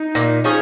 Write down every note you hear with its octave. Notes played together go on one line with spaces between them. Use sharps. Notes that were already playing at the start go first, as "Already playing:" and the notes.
Already playing: D#4
A#2
F3 C#4 G#4